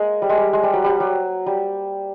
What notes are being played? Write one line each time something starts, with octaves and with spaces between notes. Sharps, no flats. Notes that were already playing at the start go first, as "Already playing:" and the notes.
Already playing: G#3 A#3
G3
G#3
G3
G#3
G3
F#3
G3
F#3
G3